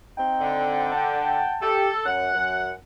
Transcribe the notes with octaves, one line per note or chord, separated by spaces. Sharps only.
C4 D#4 G5
D3
F#5 G5 A5
G4 A4
F#2 F#5
F#2